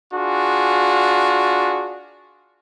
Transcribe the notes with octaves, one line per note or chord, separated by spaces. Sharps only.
D4 F4 F#4 G#4